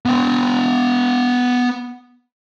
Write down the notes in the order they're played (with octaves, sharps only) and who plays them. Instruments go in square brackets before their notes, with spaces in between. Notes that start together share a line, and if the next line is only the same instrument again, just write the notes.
[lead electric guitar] B3 G5